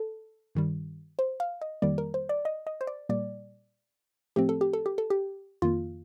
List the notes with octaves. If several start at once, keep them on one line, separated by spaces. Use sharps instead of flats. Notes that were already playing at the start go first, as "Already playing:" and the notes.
Already playing: A4
G2 D#3 G3
C5
F5
D#5
F2 D#3 G3 A#3 D5
A#4
C5
D5
D#5
D#5
C5
D5
A#2 G3 A#3 D5
A2 F3 A3 C4 G4
A4
G4
A4
G4
A4
G4
F2 D#3 A#3 F4